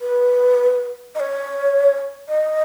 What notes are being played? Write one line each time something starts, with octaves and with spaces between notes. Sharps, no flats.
B4
D#5
C#5
D#5